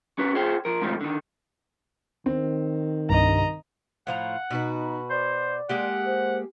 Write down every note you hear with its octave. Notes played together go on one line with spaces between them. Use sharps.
C#4 F#4 B4
F4 G#4 C5 G5
F3 A#4
G#2 C3 D#3 F3 G3 A3
D3 D#3
D#3 C4
C2 G2 D#5 A#5
A2 F3 F5 F#5 A#5
B2 D#4 F#4 B4
C5 D5
G#3 A#3 G4 F#5
C5